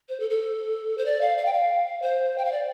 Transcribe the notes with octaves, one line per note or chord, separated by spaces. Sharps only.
C5
A4
A4
C5
D5
F5
F5
G5
F5
C5
G5
F5
D5